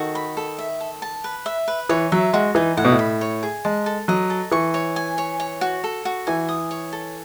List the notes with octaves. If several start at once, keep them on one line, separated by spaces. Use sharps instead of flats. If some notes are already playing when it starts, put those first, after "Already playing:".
Already playing: D#3 F#4 A4
B5
A4
E5
A4
A5
B4
E5
B4
E3 C#5
F#3 E5
G#3 F#4
E3 D#4
A2 F#5
B2
A2
B5
C#5
G#4
G#3 A5
A4
F#3 D#5
A4
E3 C#6
C#5
G#5
C#5
C#5
F#4
A4
F#4
E3 G#5
D#6
C#5
A4